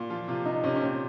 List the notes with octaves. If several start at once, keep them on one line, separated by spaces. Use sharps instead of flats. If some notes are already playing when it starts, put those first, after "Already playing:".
Already playing: A#2
F3 F4
C3 F4
C3 D#4
C3 C#4
C#4
A#2 C4